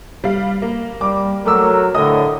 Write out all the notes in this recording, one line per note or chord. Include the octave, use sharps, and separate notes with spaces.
G3 F5
A#3
G3 D6
F#3 A3 A#4 D6 E6
A2 D3 D#5 D#6